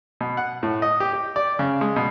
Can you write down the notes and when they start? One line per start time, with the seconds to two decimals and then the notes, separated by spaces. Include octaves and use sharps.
0.21 B2
0.37 F#5
0.63 A2
0.82 D#5
1.00 G4
1.13 G4
1.36 D5
1.59 C#3
1.81 G#3
1.96 B2